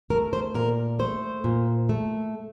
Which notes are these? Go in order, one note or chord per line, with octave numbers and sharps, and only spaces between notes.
A3 A#4
C5
A#2 A#4
A3 C5
A#2
A3